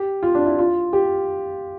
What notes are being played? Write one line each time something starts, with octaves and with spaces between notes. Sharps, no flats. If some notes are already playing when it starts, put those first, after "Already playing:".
Already playing: G4
F4
D4
E4
F4
G4